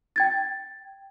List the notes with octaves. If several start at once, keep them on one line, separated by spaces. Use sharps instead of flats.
G5 G#6 A6